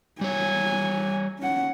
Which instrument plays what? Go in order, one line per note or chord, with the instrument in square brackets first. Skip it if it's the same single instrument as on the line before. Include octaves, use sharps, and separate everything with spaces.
[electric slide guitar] G3 C#5 [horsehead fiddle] G#5
[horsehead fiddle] C#4 F#5